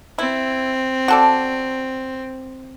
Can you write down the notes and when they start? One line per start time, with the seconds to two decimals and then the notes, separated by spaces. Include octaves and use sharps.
0.18 C4 E4
1.08 F#4 A4 D5